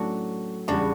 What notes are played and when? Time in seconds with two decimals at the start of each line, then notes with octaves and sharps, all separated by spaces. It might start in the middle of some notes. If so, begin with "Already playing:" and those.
Already playing: A2 F#3 A3 C#4 D4 F#4
0.68 E2 C#3 G3 D4 F#4